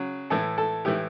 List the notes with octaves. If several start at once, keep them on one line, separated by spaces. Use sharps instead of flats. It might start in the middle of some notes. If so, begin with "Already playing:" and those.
Already playing: C#3 F#3
A2 E3 A4
A4
A2 E3 G4